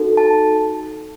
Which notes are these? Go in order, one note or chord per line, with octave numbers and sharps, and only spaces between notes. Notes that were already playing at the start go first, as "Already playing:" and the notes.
Already playing: D#4 F#4 A4
A5